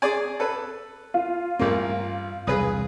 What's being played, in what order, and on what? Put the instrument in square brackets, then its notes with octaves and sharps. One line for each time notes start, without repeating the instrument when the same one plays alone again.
[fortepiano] G#4 D5 G#5
A4 B4
[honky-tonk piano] F4
[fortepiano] A1 A#3 [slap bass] G2 C4
[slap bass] E1 C2 [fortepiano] G#4 B4 D#6